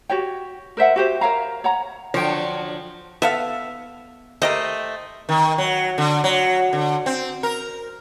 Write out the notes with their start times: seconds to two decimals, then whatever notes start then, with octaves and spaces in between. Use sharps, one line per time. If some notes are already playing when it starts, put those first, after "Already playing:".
0.09 F#4 G4 C#5 G5
0.77 A#4 C5 E5 F#5
0.96 F#4 G4 C5
1.21 A#4 C#5 F5 A#5
1.64 C#5 F#5 A#5
2.14 D3 F3 F#3 C#5 G5
3.22 B3 A4 E5 F5
4.42 A3 G4 A#4 C5 D#5
5.29 D#3
5.58 F#3
5.98 D3
6.24 F#3
6.73 D3
7.06 C4
7.43 A#4